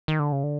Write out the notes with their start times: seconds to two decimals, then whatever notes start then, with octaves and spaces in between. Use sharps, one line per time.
0.08 D#3
0.19 D3
0.32 C#3
0.43 D3